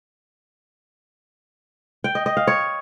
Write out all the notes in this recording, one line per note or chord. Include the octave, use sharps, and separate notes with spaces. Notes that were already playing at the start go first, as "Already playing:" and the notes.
G5
D#5
D#5
F5
C#5